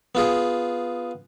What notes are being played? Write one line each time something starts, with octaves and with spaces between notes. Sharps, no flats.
B3 F4 G#4